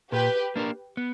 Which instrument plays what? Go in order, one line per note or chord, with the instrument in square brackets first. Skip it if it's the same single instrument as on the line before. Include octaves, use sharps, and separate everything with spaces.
[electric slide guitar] A#2 [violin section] G4 B4
[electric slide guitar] A#3 D4 A#4
B3